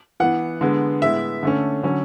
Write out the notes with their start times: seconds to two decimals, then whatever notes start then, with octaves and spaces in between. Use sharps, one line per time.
0.20 E3 B3 F#5
0.61 D3 G#3 B3
1.02 A2 G#3 B3 E5
1.43 D3 A3 C#4
1.83 D3 F#3 C#4